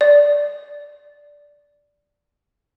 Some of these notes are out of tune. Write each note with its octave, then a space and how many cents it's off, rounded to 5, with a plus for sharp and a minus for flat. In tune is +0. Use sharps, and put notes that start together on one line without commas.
D5 -10